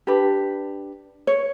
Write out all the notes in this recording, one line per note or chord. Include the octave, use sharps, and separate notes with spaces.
D4 G4 B4
C#5